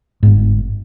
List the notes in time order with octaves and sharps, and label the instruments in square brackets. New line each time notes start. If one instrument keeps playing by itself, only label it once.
[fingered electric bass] G1 G#2